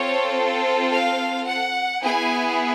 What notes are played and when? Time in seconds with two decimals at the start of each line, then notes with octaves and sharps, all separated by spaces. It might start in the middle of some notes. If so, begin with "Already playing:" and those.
Already playing: C4 F4 A4 C#5
0.91 F5
1.47 F#5
2.02 B3 E4 G#4 G#5